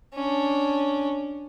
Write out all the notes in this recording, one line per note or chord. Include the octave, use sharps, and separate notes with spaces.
C#4 D4